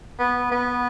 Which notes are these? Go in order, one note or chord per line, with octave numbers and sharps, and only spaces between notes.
B3
B3